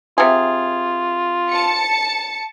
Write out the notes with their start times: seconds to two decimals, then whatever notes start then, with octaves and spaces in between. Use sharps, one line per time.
0.18 C3 F4 G#4
1.52 A5 C#7